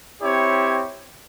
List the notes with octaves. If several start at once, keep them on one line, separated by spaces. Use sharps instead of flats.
C4 E4 G4 C#5